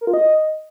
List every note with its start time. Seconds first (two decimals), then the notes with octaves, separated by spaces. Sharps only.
0.01 A#4
0.07 F4
0.14 D#5